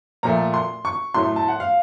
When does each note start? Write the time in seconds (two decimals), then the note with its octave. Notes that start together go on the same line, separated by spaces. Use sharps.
0.23 A#2 F3 A3 A#5
0.54 C6
0.85 C#6
1.14 A2 F#3 A3 C6
1.36 A5
1.48 F#5
1.60 F5